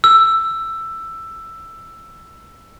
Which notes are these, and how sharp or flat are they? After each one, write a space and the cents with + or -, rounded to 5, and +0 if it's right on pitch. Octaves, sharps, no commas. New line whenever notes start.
E6 +10